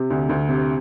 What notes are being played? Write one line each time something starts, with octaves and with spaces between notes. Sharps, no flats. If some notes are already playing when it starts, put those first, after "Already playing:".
Already playing: C3
D2
D2
C3